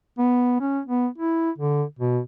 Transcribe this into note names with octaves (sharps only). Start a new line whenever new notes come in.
B3
C#4
B3
E4
D3
B2